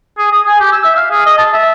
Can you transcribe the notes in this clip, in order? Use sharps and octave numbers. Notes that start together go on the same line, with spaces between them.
G#4
D#6
G#5
G4
E6
E5
F5
G#4
D#5
A5
E5